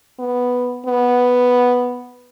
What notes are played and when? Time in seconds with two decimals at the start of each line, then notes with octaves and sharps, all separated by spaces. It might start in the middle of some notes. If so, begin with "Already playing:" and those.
0.19 B3
0.86 B3